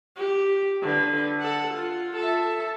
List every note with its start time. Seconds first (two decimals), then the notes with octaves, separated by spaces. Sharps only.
0.16 G4
0.82 D3 B4
1.40 A4 F#5
1.74 F4
2.16 A4 E5